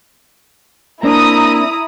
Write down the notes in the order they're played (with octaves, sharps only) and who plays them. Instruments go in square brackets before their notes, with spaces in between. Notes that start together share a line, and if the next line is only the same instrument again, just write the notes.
[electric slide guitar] A#3 C4 D4 [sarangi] E4 [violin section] A#5 D#6